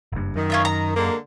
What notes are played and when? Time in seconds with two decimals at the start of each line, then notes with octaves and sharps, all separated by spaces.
0.12 F#1 G2
0.36 F#2 D#3
0.50 C#4 F4 E5
0.65 A#5
0.95 D3 G#3 A#3